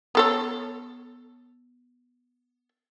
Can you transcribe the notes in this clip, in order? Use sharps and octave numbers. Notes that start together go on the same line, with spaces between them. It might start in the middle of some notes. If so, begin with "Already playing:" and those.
B3 A4 C#5